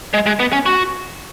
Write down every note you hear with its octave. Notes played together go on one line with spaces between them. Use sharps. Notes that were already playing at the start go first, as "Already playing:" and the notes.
G#3
G#3
B3
C#4
F#4